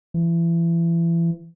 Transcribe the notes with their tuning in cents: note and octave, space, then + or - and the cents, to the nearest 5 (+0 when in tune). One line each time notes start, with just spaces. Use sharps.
E3 +30